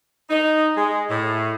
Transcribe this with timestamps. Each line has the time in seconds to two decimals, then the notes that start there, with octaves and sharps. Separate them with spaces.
0.30 D#4
0.77 G#3
1.10 A2